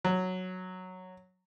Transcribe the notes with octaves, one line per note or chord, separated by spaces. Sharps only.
F#3